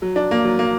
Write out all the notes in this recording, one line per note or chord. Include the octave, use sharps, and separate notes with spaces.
F#3
D4
A#3
F#3
A#3